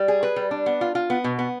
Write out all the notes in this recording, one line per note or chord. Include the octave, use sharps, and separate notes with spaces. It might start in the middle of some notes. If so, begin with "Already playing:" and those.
Already playing: G3
G#4
B4
G3
D4
B3
F4
F4
B3
B2
B3